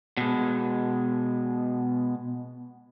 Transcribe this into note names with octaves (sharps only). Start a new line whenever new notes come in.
B2 G#3